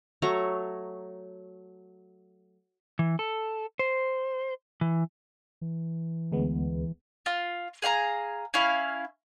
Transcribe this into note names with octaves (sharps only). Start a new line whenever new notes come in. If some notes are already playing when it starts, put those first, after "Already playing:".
F#3 A3 C#5 A#5
E3
A4
C5
E3
E3
D2 G#3 B3
F4
G#4 F5 G5 A#5
C#4 E4 F5